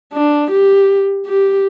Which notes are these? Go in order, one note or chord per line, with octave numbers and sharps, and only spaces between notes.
D4
G4
G4